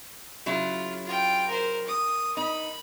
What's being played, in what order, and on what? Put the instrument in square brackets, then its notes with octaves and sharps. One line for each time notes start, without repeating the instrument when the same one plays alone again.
[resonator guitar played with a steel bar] C#3 F#3 E4 [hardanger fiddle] F4
[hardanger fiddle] F4 G5
A#4 C5
D#6
[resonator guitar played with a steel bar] D#4 [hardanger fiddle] B5